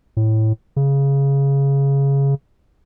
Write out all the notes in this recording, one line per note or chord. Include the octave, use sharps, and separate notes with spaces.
A2
C#3